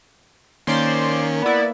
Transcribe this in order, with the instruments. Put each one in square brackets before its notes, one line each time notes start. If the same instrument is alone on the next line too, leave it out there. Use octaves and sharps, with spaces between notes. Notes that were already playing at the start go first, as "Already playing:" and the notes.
[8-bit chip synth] D#3 C#4 [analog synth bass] A#3 [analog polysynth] C5 D5 C6
[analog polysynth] B3 E4 [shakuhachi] D5